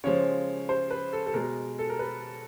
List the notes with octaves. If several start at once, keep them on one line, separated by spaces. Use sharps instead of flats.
C#3 F3 G#3 C#5
C5
B4
A4
A4
B2 G#3 A#4
A4
A#4
B4